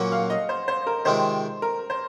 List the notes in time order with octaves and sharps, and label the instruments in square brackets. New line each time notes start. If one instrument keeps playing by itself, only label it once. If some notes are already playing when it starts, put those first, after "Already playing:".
Already playing: [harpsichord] A#2 F#3 A#3 C#4 [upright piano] F#5
[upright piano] F5
D#5
C5
C5
A#4
[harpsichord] C3 D#3 G#3 C4 F4 [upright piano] C5
[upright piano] A#4
C5